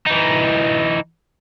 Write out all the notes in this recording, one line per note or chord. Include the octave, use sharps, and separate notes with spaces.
E3 D#4